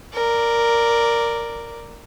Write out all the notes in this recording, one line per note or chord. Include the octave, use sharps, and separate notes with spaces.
A#4 D5